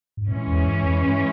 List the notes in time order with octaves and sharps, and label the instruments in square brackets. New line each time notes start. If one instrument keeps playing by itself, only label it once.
[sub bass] G#2
[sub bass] A#2 [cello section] E3 G#3 C#4
[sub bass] E2
F2
G2
F2
G2